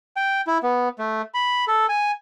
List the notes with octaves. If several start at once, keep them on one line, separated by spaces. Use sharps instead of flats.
G5
E4
B3
A3
B5
A4
G#5